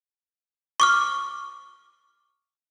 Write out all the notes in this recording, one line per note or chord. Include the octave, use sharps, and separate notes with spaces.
C#6 D6 F6